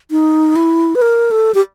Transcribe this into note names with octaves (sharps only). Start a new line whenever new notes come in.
D#4
E4
B4
A#4
A4
G4